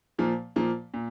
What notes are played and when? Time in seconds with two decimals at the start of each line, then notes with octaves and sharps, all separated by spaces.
0.19 A#2 F3 A#3
0.56 A#2 F3 A#3
0.94 A#2